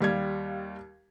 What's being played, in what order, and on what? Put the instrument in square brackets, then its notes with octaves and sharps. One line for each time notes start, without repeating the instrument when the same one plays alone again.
[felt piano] D#2 G3 F5 G#6